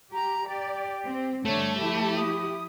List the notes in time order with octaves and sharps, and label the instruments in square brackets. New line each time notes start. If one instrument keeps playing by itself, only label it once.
[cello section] G4 [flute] A#5
[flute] G4 [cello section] D5
[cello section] C4
[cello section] G2 D3 C#5 [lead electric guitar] A3 [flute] A5
[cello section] F3 E4 G4 [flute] A5
[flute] D#6